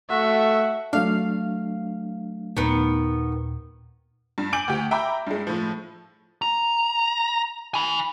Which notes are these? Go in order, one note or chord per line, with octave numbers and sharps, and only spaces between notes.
A3 F#4 E5
F#3 A3 D4 F5
D#2 A#2 D#3 B3
G2
G#5 D6 G6 D7 F#7
D2 G4
E5 G5 A#5 B5 D6 G6
G2 G#3
A2 F3
A#5
G#5 B5